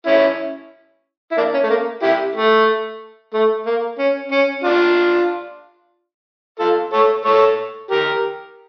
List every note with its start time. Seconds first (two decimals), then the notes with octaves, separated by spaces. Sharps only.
0.06 C#4 E4
1.32 E4
1.37 A#3 D4
1.54 C#4
1.63 A3
1.70 A#3
2.03 E4 G4
2.35 A3
3.33 A3
3.66 A#3
3.99 C#4
4.32 C#4
4.64 D4 F4
6.59 F4 A4
6.93 A4 C#5
7.25 A4 C#5
7.90 G4 A#4